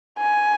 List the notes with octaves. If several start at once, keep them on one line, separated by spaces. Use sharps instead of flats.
G#5